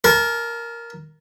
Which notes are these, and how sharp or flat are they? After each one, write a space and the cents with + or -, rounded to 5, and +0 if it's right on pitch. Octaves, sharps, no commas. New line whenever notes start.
A#4 +0 A5 -30